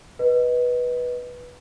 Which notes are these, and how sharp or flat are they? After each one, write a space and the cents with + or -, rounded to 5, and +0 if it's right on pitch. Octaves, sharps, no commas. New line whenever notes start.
B4 -10 D#5 +0